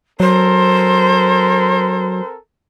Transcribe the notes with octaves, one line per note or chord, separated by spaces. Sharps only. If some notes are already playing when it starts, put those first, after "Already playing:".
F#3 C4 A4 A#4 C5